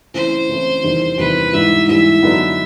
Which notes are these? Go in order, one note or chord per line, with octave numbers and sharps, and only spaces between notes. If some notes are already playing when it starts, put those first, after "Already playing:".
C#3 E3 A3 C4 E4 C5
C#3 E3 A3 C4 E4
E2 C3 D#3 G3
E2 C3 D#3 G3 B4
G#2 E3 G3 E5
G#2 E3 G3 E5
F#2 D3 F#3 B3 D#4